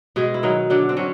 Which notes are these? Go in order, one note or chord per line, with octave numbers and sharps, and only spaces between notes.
B2 G#3 G#4
E4
D#3 F#3 D#4
D3 F#3 D4
C4
F#3 C#4